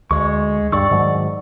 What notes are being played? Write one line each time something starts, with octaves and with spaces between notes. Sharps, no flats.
D2 G#3 C#6
G2 D5 C#6 E6
G#2 D#3 F#3